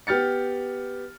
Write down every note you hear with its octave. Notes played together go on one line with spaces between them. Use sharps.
B3 G4 F6 A6 C#7